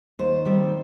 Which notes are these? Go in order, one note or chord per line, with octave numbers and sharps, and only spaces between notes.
D#2 C5
D#3 G3 C4